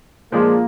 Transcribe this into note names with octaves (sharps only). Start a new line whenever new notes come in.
A#2 F3 G#3 A#3 D4 G#4